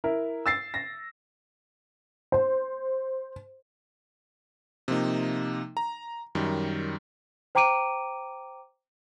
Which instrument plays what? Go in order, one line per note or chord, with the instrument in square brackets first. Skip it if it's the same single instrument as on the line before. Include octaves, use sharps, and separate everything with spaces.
[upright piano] E4 A#4
E6 A6 C7
A#6
[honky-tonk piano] C5
[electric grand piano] C3 F3 A#3 D#4
A#5
F#2 D#3 G3
[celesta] C5 G5 A#5 D6 D7 D#7